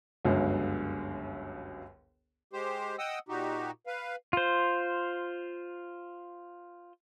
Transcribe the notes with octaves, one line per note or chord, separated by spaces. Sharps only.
G1 C#2 F#2 D3
G#3 G4 C5
D#5 F#5 G5 D#6 E6
A#2 D#4 F#4 G4
B4 F5
F4 C5